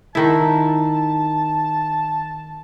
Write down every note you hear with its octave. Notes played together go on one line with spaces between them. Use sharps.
D#3 E4 A5